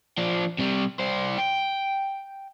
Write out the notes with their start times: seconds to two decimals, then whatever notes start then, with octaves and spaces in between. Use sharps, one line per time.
0.18 F3 D4
0.59 C3 G3
0.99 G3 C5
1.38 G5